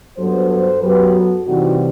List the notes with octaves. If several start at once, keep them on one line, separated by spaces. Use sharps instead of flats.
G2 F#3 B3 A4 C5
A4 C5
F#2 F#3 B3 G4 B4
F#4 A4
C3 E3 G3 C4 D#4 F#4